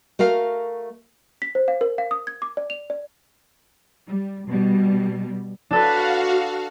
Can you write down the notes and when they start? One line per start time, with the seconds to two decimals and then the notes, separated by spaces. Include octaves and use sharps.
0.19 A3 F#4 A#4 F5
1.42 B6
1.55 C5
1.68 F5
1.81 A#4
1.98 F5
2.11 D#6
2.27 G#6
2.42 D6
2.57 D5
2.70 F7
2.90 D5
4.09 G3
4.48 B2 G3
5.71 D4 F#4 A4 B4 F5